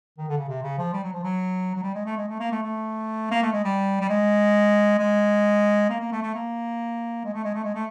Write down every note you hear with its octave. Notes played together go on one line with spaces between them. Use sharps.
D#3
D3
C#3
C3
C#3
F3
G3
F#3
F3
F#3
F#3
G3
G#3
A3
G#3
A3
A#3
A3
A3
A#3
A3
G#3
G3
G3
G#3
G#3
A#3
A#3
A3
A3
A#3
G#3
A3
G#3
A3
G#3
A3